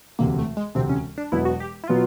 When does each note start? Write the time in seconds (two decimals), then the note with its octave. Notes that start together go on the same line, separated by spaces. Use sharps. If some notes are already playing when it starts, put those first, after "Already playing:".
0.19 E1 D2 C3 A#3
0.39 A3
0.57 G#3
0.75 E1 D2 C3 C4
0.89 C#4
1.18 D4
1.32 E1 E2 B2 F#3 B3 E4
1.45 F#4
1.60 G4
1.84 E4
1.88 B2 F#3 B3 F4